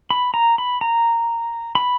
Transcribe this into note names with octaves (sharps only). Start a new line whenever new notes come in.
B5
A#5
B5
A#5
B5